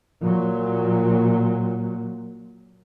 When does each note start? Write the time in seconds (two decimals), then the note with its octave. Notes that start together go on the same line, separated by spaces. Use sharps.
0.23 A#2 F#3